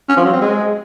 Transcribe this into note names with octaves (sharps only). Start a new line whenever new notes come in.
C#4
F3
F#3
C4
G#3